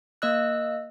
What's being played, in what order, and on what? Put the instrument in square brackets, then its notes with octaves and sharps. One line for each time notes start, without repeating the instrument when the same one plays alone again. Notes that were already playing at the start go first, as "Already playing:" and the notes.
[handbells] A#3 D#5 E6 F#6